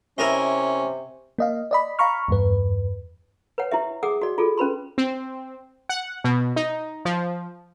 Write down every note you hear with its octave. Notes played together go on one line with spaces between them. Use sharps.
C3 C#4 E4 A#4 D#5
A#3 D#5 F5
D5 D#5 B5
F5 A#5 B5 C#6 F6
E2 G2 B4
B4 C#5 F#5
E4 G4 E5
G#4 F#5 D6 D#6
F#4 D5
F4 G#4 A4
C#4 B4 B5 C6
C4
F#5
B2
D#4
F3